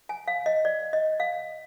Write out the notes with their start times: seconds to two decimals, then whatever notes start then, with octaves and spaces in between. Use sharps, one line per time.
0.09 G#5
0.28 F5
0.46 D#5
0.65 D5
0.93 D#5
1.20 F5